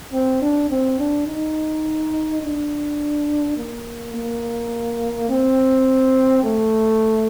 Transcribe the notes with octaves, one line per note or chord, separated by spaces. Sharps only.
C4
D4
C4
D4
D#4
D4
A#3
A#3
C4
A3